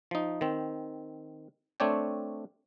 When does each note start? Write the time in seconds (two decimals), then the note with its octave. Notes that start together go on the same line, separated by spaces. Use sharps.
0.11 F3 D#4
0.41 D#3 C4
1.80 A3 C4 D4 C#5 D5 G5